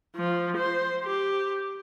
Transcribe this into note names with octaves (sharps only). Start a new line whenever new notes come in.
F3
C5
G4